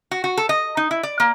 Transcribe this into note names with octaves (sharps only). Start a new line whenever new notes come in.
F#4
F#4
A4
D#5
D#4
E4
D5
A#3